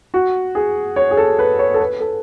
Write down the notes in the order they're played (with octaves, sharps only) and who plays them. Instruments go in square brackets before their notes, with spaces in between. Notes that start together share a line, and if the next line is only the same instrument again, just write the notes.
[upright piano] F#4
G#4
C#5
G#4
A4
B4
C#5
A4
B4
A4